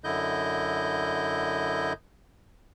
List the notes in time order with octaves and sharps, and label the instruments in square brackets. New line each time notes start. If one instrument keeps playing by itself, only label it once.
[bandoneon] F#2 D3 E4 D#5 G6